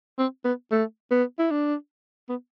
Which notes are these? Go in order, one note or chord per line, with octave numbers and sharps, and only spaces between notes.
C4
B3
A3
B3
E4
D4
B3